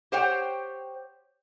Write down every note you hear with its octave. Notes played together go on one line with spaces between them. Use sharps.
G4 C5 C#5 F#5 G5